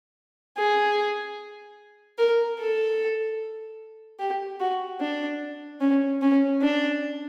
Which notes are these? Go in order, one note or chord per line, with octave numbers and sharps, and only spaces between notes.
G#4
A#4
A4
G4
F#4
D4
C#4
C#4
D4